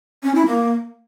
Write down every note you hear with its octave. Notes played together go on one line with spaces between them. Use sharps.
C#4
E4
A#3